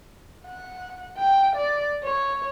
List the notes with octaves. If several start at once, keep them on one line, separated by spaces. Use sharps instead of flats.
F#5
G5
D5
C#5